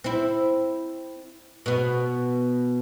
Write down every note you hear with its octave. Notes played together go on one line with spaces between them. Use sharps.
C4 E4
B2 B3